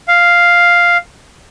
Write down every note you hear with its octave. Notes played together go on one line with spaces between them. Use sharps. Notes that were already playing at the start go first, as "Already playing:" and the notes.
F5